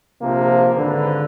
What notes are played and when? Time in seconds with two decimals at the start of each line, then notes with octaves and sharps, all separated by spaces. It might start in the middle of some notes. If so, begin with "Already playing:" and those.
0.22 A#1 C3 F3 A#3
0.77 G#1 D3 B4